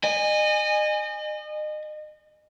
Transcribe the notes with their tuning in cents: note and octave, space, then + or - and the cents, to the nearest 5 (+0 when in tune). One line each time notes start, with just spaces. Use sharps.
D#5 -35 G#5 -15